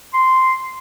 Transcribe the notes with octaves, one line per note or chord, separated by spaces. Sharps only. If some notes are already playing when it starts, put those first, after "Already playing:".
C6